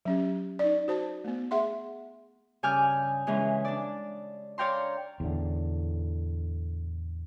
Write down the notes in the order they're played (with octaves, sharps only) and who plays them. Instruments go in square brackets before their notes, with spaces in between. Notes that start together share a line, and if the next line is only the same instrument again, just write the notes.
[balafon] F#3 C#4 G4
D#4 D5
F#4 C5 A5
A3 B3
G#4 E5 F#5 C6
[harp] G2 C#3 G#5 D6 F6 G6
C#3 E3 G#3 C#4
D4 D5
C#5 D5 F5 G5 A#5 C6
[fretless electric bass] E2 A2 D3